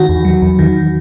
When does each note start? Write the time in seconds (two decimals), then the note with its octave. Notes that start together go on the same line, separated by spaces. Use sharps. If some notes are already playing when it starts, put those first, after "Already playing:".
Already playing: D#3 F#4
0.09 E2
0.25 F#3
0.42 E2
0.59 D#3